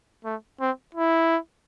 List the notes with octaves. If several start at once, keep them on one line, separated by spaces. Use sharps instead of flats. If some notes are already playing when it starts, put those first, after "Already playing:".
A3
C4
E4